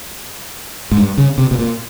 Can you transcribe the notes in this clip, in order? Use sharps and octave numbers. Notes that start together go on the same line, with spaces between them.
G#2
G2
C#3
C3
B2
A#2